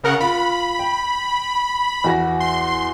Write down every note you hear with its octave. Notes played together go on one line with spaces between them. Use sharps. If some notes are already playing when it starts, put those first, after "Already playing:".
C#3 A#4 F#5
F4 B5
G5
E2 F#4 A#6
C6